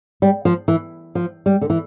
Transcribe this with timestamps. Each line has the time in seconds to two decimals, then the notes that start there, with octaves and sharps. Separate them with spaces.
0.22 G3
0.45 F3
0.68 E3
1.15 F3
1.46 G3
1.61 D3
1.70 E3